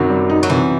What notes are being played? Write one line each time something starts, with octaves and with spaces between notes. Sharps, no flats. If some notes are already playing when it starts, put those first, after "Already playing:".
Already playing: F#2 C3 D#3 F#3
G3
D#4
F#3
C3 E3